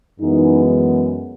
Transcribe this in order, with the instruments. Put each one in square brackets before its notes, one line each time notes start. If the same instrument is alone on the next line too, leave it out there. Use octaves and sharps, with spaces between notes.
[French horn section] F#2 E3 G#3 B3 D#4